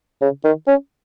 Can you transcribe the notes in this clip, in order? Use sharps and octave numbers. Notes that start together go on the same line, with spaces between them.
C#3
D#3
C#4